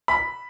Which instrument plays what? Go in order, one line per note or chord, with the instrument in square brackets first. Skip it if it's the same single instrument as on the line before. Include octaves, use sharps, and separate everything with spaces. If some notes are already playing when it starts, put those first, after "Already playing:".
[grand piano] B5